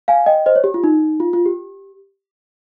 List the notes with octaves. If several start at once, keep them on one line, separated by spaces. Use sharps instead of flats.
F5 G#5
D#5 G5
C5 D#5
C#5
G4
F4
D#4
F4
F4
G4